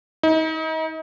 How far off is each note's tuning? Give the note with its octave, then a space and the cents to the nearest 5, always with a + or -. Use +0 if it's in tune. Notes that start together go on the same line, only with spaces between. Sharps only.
D#4 +35